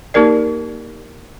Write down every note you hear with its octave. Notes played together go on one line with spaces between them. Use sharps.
A#3 D#4 G4 A#4 D5